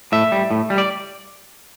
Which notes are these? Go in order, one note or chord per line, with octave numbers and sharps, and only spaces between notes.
A2 E5
G3
A2
G3
D5